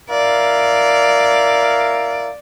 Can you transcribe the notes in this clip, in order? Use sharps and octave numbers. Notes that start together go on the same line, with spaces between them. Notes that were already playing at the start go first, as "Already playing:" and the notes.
E4 A#4 D5 F5